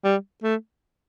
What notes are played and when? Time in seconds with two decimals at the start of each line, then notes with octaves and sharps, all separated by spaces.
0.04 G3
0.43 A3